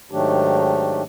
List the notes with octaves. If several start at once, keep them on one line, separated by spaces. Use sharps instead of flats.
G#2 D#3 F#3 A3 D4 G4